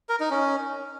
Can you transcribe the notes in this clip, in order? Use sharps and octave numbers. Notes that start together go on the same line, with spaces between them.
A#4
D#4
C#4